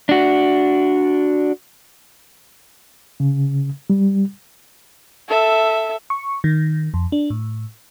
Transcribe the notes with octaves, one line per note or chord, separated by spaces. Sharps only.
D4 F#4
C#3
G3
A4 E5
C#6
D#3
F2
D4
A2